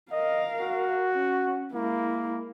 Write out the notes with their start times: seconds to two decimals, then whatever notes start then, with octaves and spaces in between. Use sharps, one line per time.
0.12 A#4 D#5 F5
0.60 F#4
1.15 C#4
1.73 G#3 A#3 E4